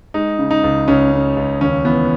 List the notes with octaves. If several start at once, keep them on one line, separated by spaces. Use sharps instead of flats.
G#3 D#4
C#3
D#4
C#2
C#2 C#4
C#3
C#2
D#2 C#4
E3 B3